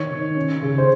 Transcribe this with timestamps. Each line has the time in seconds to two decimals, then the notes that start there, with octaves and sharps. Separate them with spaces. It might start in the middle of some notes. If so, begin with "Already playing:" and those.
Already playing: D#3 C#5
0.11 D#3
0.36 C#4
0.62 C#3
0.78 C5